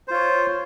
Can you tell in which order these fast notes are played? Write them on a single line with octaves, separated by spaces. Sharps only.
C5 F4 C#5